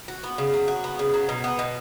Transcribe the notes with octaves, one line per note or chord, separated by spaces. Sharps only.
F#4
B3
C#3
F#3
F#4
B3
C#3
F#3
B2
B3
B2